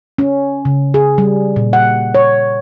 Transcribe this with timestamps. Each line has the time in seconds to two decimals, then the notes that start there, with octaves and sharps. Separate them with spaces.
0.18 C#4
0.65 C#3
0.94 G#4
1.18 G3
1.56 A#2
1.73 F#5
2.15 C#5